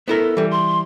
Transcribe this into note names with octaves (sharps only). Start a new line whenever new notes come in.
B3 E4 A4 A#4
E3 G3
C6